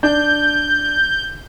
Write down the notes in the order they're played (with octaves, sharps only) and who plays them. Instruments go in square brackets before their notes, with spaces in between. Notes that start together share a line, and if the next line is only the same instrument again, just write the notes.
[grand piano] D4 [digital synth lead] G6